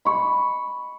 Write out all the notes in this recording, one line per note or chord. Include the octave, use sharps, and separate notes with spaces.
B5 C#6